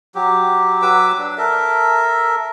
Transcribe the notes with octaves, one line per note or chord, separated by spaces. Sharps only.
F#3 G4
F#3 B4 D6 E6
D4
A4 A#4 E5